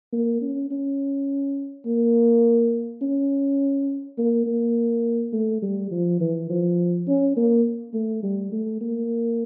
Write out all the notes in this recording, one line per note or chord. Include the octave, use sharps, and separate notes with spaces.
A#3
C#4
C#4
A#3
C#4
A#3
A#3
A3
G3
F3
E3
F3
C#4
A#3
A3
G3
A3
A#3